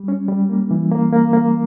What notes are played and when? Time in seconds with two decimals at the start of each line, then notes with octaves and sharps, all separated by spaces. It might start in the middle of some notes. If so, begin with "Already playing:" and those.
Already playing: G3
0.08 C#4
0.28 G3
0.49 A#3
0.71 E3
0.91 A#3
1.12 A#3
1.33 A#3